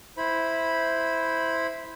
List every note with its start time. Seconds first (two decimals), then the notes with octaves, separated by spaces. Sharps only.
0.17 E4 C5 B5